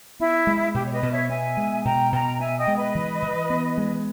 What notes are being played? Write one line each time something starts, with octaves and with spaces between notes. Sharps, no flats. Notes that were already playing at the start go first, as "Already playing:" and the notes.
B3 E4
G#3
B2 G4
C#5
B4 D#5
B2
C#5 E5
B3 E5 G#5
G#3
B2 G5 A#5
B2 G5 A#5
B3 E5 G#5
D#5 G5
G#3
B4 D#5
E3
E3
B3
G#3